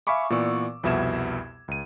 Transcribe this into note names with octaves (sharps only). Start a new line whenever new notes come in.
E5 F5 G#5 B5 C#6 D6
A#2 E3 B3 D5 C#6 E6
C2 F2 B2 E5 G#6 E7
C#2 D#7